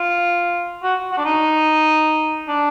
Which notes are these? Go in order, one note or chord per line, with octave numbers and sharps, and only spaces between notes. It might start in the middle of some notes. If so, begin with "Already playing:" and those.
Already playing: F4
F#4
F#4
D4
D#4
D4